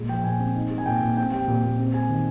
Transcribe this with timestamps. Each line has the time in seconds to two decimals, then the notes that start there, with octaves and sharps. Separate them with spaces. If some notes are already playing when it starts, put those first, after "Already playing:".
Already playing: A#2 G#3
0.09 F3 G5
0.24 A#2 G#5
0.39 C4
0.55 D#4
0.70 G#3
0.78 G#5
0.86 A#2 G5
1.02 A#2
1.17 C4 G5
1.32 G3 G5
1.47 A#2
1.63 A#2
1.79 C4
1.94 G#3 G#5
2.09 D#3